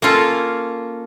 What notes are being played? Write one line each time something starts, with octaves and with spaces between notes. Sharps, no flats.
A#3 C#4 F4 A4